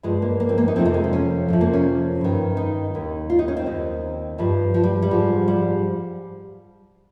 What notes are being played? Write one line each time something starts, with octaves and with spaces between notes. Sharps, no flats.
G2 F3 G#3
A#3
A#3
C4
A#3
D#4
F2 C3 F3 C4
A#3
G#3
C4
C#4
F2 C3 F3
A#3
C#4
G2 D#3
D#4
D#2 D#3
F4
D#4
C#4
C4
D#2 D#3
G2 F3 G3
F3
G3
G3
G#2 F3
G3